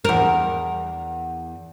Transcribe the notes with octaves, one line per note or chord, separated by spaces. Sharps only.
E2 A#4